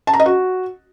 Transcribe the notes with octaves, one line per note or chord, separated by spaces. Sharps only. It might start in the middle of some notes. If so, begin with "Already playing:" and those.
A5
A#5
D#5
F#4